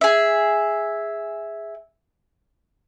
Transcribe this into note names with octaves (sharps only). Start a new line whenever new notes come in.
G#4 E5